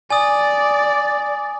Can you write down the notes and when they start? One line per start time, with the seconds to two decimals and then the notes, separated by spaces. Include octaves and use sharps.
0.10 D5 G#5 D#6